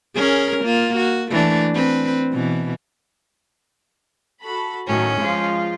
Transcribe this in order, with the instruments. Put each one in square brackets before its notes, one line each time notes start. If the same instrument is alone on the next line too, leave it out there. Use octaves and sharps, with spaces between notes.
[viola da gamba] C#4 G#4 A#4
A#3 F4
F#4
E3 A3 D4
C4 B4
B2 E3
[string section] F#4 A4 B5
[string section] A2 D#3 F#3 [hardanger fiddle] C#4
[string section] F3 G#3 F4